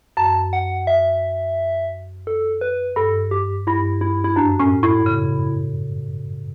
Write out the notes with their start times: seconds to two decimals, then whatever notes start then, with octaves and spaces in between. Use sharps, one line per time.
0.17 F#2 A5
0.53 F#5
0.87 E5
2.27 A4
2.61 B4
2.96 G2 A4
3.31 G4
3.67 G2 E4
4.01 E4
4.24 E4
4.36 F#2 D4
4.60 A2 C#4
4.83 A2 E4
5.06 C#3